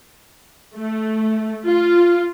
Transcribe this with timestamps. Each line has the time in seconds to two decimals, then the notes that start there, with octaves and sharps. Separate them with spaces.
0.76 A3
1.66 F4